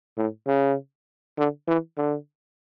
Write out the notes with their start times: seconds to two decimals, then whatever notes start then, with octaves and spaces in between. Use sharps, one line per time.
0.18 A2
0.47 C#3
1.38 D3
1.68 E3
1.98 D3